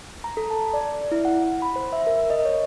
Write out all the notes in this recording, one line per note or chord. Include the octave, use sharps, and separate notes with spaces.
A#5
A4
A5
D5
E4
F#5
B5
C5
E5
A#4
D#5
C#5